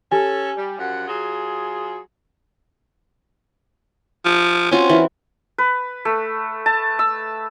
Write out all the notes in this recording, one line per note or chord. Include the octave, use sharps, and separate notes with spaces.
C#4 G4 A4 G#5
G3
F#2 F3 F#5
F#3 F4 G#4
F3
C4 C#4 F4 F#4
E3
B4
A3
A5
E6